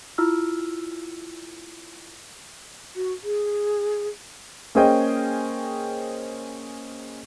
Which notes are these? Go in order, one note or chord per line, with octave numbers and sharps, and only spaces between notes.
E4 F4 E6 F6
F#4
G#4
A#3 C#4 G#4 C5 D#5 G5